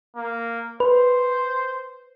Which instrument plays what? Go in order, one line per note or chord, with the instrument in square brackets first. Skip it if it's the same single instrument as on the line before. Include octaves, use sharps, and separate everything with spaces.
[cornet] A#3
[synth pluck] B4 [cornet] C5